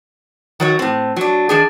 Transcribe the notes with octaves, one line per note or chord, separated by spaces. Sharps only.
D#3 F#3 C#5
A2 C4
F#3 D4
D#3 D4 G#4